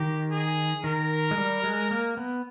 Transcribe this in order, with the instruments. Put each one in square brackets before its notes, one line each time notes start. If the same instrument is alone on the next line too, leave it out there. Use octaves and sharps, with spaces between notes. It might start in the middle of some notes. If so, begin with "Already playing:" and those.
Already playing: [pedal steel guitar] D#3 [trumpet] G4
[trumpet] G#4
[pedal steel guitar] D#3 [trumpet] A#4
[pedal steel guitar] G#3
G3
G#3
A#3
B3